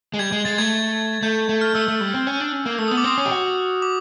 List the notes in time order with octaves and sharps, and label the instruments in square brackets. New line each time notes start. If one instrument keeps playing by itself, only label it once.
[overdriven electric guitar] G#3
[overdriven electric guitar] G3 [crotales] G#6
[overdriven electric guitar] G#3
[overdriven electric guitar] G#3 [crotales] A6
[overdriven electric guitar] A3 [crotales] G#6
[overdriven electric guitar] A3 [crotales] G6
[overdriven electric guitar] A3
[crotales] F6
[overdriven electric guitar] A3 [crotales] E6
[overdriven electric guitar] A3
G3
C4
C#4
D4
C#4
A#3
[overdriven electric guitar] A3 [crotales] E6
[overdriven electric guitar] B3 [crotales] D#6
[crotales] D6
[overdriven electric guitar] C4 [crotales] D#6
[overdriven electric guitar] C#4
G4
F#4
[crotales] D6